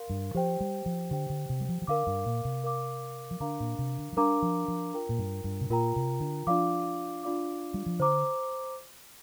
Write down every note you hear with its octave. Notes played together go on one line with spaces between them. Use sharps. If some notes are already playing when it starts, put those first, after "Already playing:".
Already playing: A#4 F5 C6
G2
F3 G4 C5 G5
G3
F3
D3 G4 C5 G5
D3
C3
G3
F3
F3
D3 A#4 F5 D6
G2
A#2
C3
A#4 F5 D6
F3
D3 D4 A#4 F5 A#5 D6
A#2
C3
D3
F3
G3 D4 A#4 F5 A#5 D6
F3
F3
F4 A#4 G5 A#5
A#2
G2
G2
C3
A#2 F4 A#4 G5 A#5
C3
D3
F3 D4 F4 D5 F5 D6
D4 F4 D5 F5 D6
G3
F3
D3 C5 A#5 D6